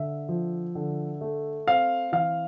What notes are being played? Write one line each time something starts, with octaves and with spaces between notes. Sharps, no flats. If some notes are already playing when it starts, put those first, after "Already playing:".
Already playing: D3 E5
F3
D3
A3
C4 F5
E3 F5